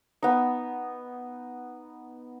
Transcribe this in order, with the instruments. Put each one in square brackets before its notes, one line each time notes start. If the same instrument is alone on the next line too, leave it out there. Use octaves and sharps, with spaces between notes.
[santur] B3 D#4